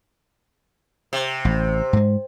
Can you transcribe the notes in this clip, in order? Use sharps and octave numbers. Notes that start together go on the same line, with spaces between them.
C3
A1
G#2 G#3